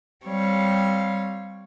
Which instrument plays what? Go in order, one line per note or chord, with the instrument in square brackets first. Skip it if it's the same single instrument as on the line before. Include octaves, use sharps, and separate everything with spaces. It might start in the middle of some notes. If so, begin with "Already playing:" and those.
[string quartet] G3 C4 C#5 F5